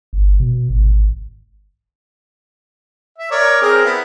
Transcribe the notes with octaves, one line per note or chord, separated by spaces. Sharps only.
G1
B2
G#1
E5
A#4 C#5 D5
C4 G#4 A#4
B3 E4